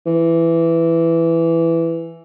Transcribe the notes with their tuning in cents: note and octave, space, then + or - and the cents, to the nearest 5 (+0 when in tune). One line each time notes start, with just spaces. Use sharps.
E3 +10